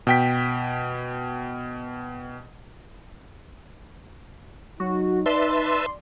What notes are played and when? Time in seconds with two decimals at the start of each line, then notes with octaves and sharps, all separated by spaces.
0.07 B2 G5 B6
4.80 F#3 D#4 F#4
5.26 B4 D5 E5 A5 C6